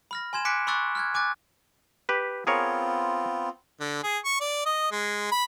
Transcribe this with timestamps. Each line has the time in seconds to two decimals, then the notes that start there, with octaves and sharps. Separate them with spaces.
0.11 B5 F6 A#6
0.33 G#5 C6 G#6 E7
0.45 G#5 D6 F#6 B6 C#7 D7
0.67 B5 C#6 D6 E6 F#6 A6
0.95 F6 F#6 G#6
1.14 G#5 D6 F#6 A6
2.09 G4 B4
2.47 B3 C4 F4 G#4 A#4 C#5
3.80 D3
4.03 G#4
4.25 C#6
4.40 D5
4.66 D#5
4.91 G#3
5.32 B5